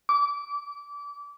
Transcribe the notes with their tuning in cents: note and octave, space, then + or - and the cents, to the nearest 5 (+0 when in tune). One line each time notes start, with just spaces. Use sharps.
D6 -25